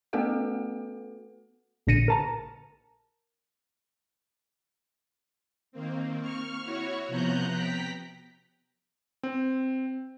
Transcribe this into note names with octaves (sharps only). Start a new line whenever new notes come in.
A3 B3 F#4 A4 B4 F#5
A#1 A#2 D3 A#6 C#7 D#7
A#4 A5 A#5
D#3 A#3 C4
C#6 F6
E4 F#4 C#5
C3 F3 B3 A#5 F#6 G6
G5 A#5 B6
C4